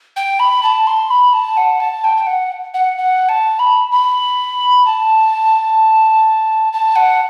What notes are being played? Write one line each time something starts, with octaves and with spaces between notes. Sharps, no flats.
G5
B5
A5
C6
B5
A5
F#5
A5
G5
G5
F#5
F#5
F#5
A5
B5
B5
A5
A5
F#5